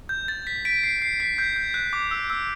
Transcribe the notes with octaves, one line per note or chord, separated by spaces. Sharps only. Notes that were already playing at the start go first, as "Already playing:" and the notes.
G6
A6
B6
B6 D7
C7
C7
B6
G6
G6
F#6
D6
E6
E6